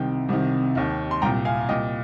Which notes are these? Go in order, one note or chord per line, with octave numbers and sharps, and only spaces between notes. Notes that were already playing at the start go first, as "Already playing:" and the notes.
Already playing: C2 C3 D#3 G5
C2 C3 D#3
D#2 D#3
C6
C2 A#2 G5 A#5
F5 G#5
C2 A#2 D#5 G5